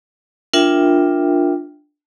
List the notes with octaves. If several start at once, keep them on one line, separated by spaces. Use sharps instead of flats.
D4 F4 A#4 E5 G5